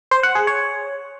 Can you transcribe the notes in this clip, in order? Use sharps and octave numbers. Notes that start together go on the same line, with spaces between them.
C5
F#5
G#4
C#5